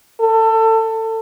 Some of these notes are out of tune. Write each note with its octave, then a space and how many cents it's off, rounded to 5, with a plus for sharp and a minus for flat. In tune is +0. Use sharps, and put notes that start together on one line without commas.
A4 +25